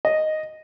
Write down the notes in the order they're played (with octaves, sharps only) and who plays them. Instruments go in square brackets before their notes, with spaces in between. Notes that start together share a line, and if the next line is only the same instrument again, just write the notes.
[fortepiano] D#5